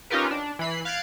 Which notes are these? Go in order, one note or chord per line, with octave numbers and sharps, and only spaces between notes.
C#4 D#4 F4 G4 A#4 B4
D4
E3 B5 C7
F5 F#6 G#6 A6 C7 D7